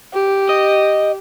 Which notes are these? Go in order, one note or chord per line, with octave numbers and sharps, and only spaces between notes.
G4
D#5